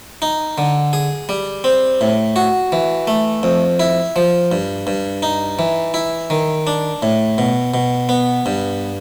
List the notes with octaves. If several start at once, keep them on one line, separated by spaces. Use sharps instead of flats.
D#4
D3
G#4
G3
C4
A2
F#4
E3
A3
F2
E4
F3
G2
G2
D#4
E3
E4
D#3
D4
A2
B2
B2
B3
G2